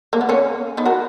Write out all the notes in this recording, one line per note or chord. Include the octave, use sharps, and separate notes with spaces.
A#3
B3
A#3 C#4
B3 D#4
F#4 A#4